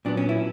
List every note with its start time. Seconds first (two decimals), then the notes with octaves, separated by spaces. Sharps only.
0.05 A#2 F#3 B3 D4
0.17 C#4
0.29 E4